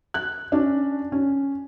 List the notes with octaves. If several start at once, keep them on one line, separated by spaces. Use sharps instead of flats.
F#6
C#4 D4
C#4